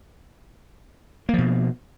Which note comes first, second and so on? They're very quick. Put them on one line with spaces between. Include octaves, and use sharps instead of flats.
A#3 F3 B2